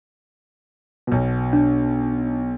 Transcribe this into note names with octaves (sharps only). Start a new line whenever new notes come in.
B1 B2
D4